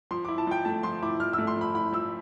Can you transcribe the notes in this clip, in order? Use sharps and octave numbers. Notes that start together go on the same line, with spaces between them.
F3 C6
E4 D6
A5
F3 G5
A3 A5
F3 C6
E4 D6
F3 F6
E6
A3
C6
F3 B5
E4 B5
F3 E6